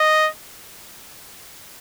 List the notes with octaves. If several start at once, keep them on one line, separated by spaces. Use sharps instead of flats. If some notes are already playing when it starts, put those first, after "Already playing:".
Already playing: D#5